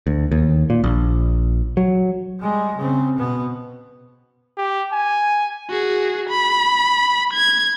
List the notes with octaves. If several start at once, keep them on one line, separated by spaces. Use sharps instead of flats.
D2
D#2
A#2
A#1
F#3
G3 G#3
C#3 C4
B2 B3
G4
G#5
F#4 G#4
B5
G#6